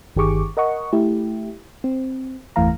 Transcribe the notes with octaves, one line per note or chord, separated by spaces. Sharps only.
G1 D#3 G4 G#4 C#6 D6
A#4 D#5 F#5 C#6
A3 E4 G4
C4
G1 E2 E3 A3 F5 A#5